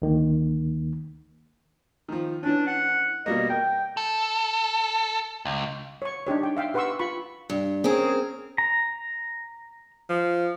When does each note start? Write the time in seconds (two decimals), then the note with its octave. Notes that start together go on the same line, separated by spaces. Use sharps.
0.02 D2 D#3 A#3
2.08 D#3 F3
2.43 E3 C#4 D4
2.67 F#5
3.26 B2 G3 A#3 D#5
3.50 A#4 G5
3.97 A4
5.45 C#2
6.02 C#5 C#6
6.27 D4 D#4 G4 C#5
6.43 G5
6.57 E5 F5 G5
6.74 G4 B4 F#5 C6 C#6 E6
6.99 F4 B5 C#6
7.50 G2
7.84 C4 C#4 G#4 A#4
8.58 A#5
10.10 F3